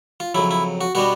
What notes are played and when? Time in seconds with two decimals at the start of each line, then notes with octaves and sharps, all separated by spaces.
0.20 F4
0.35 F2 C#3 F#3 E4
0.51 E4
0.81 F#4
0.95 B2 G3 B3 D4 F#4